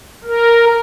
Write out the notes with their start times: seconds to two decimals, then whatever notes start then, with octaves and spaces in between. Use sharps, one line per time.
0.24 A#4